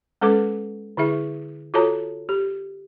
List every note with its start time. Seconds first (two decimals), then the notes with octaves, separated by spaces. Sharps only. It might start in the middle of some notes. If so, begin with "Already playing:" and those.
0.21 G#3 C#4 A4 B4 D6
0.97 D3 E4 G#4 E5
1.74 F4 F#4 A4 C#5 A5 A#5
2.29 G4